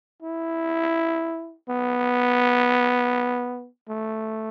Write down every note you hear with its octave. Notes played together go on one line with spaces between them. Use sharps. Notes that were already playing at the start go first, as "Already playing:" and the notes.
E4
B3
A3